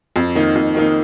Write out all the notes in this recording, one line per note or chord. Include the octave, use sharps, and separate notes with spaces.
F2
D#3 A#3 D#4
F2
D#3 A#3 D#4